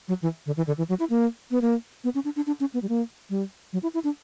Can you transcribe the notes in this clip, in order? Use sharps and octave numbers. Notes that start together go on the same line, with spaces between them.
F#3
E3
D3
E3
D3
E3
F#3
E4
A#3
B3
A#3
B3
C#4
D4
D4
D4
C#4
B3
G3
A#3
G3
F#3
E4
E4
D4